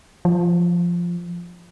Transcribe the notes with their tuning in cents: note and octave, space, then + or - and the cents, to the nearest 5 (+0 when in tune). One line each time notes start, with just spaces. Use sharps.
F3 -5